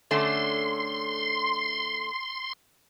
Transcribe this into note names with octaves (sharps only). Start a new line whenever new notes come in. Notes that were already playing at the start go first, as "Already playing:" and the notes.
D3 A3 C#4 C6